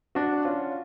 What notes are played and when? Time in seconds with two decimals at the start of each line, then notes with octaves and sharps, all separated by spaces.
0.15 D4 F#4
0.45 C#4 F4